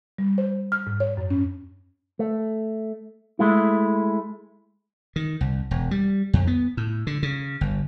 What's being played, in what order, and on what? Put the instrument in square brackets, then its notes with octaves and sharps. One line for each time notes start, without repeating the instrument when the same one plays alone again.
[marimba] G3
C5
F6
G#2
C#5
F#2
C#4
[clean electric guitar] A3
G#3 A3 E4
[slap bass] D#3
C2
E1
G3
F2
B3
A2
D3
C#3
G1